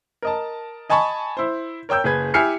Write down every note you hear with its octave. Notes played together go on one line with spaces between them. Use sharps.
A#4 D#5 A5
D#5 G#5 A5 B5 C#6
E4 C5
A#4 C#5 G5 E6 G6
F#1 G#4 B4 G#6
E4 G4 G#5 F6 C7 C#7